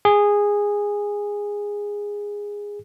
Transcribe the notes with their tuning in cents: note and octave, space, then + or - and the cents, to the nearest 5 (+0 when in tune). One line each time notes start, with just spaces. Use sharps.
G#4 -15